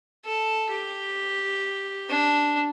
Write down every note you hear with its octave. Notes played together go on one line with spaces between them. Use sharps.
A4
G4
D4